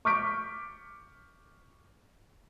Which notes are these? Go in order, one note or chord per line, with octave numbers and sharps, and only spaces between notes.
C#6 D6 F6 G6 B6 D7